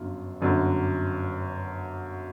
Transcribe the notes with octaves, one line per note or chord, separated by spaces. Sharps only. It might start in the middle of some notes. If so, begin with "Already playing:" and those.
Already playing: G1 F#2 D3 F4
G1 F#2 D3